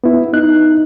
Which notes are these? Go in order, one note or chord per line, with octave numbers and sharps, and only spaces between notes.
B3 E4
D#4 F#6